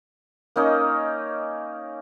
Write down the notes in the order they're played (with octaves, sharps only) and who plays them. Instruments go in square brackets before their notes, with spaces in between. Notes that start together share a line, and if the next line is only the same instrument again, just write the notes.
[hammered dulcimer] A#3 C#4 D#4 D#5